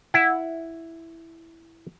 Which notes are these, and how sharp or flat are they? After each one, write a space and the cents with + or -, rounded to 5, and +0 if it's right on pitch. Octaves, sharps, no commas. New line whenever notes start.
E4 +0 F#5 +0